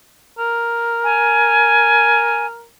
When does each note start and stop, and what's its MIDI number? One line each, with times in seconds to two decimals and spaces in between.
0.39 2.67 70
1.04 2.46 80